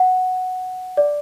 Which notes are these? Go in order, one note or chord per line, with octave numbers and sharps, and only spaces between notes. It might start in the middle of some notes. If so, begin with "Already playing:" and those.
Already playing: F#5
D5